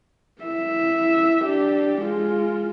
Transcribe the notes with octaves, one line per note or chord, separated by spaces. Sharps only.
E4 E5
D4 G4
G#3 F4